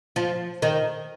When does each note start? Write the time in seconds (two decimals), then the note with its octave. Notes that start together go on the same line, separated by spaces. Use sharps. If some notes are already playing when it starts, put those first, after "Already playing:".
0.16 F3
0.62 D#3